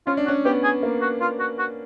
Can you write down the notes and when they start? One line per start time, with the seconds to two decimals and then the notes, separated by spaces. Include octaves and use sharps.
0.07 C#4 F4
0.17 D4
0.25 F#4
0.28 C#4
0.45 B3 G4
0.64 G#4
0.83 A#3
1.02 F#4
1.21 F4
1.40 F#4
1.59 F#4